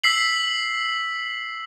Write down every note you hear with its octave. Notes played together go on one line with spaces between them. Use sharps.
E6 B6 C7 F#7